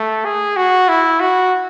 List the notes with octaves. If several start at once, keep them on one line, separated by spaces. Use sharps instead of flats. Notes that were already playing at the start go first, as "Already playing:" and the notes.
Already playing: A3
G#4
F#4
E4
F#4